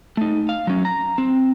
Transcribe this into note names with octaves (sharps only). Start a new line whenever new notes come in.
A3 D#4
F5
F#3 C#4
A#5
C4